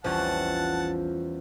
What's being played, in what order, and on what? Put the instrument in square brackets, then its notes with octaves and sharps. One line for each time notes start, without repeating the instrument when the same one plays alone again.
[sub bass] A#1 [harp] E2 G3 C#4 [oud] F3 [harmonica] F#5 A5